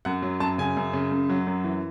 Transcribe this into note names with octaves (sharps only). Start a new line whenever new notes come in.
F#2 F#5
F#3
F#2 A5
C#3 G#5
F#2
C#3
F#2
F#3
F#2
E3